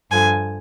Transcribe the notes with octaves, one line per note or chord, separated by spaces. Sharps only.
G2 D3 F3 G#5